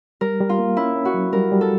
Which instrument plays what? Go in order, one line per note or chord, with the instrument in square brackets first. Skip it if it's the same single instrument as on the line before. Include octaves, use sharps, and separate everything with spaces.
[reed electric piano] G3 [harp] A#4
[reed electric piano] G3
[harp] F4
[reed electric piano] A#3
[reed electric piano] C#4 [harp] E4
[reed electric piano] C#4
[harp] F#4
[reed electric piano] F#3
[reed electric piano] G3 [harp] A#4
[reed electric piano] G3
[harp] A4